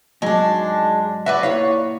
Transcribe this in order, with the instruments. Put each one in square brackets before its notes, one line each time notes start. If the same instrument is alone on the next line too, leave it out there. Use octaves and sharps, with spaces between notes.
[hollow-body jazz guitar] G#2 F#3 [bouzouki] G#3 D4
[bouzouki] F#4 B4 D5 [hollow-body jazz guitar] E5
[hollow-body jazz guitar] A#2 E4 F5 [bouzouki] C#5